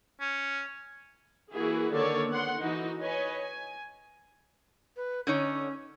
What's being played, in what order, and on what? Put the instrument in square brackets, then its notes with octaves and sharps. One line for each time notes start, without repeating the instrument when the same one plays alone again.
[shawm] C#4
[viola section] E3 A#3 E4 F#4 G#4
D3 D#3 A#3 A4 C#5 D5
B3 F#5 C6
E3 D#4 F#4
B4 C#5 D#5 G#5
G#5
[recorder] B4
[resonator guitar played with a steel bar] D3 D#4 C#5 [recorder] C#4